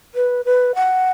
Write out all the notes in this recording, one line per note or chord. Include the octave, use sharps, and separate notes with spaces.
B4
B4
F#5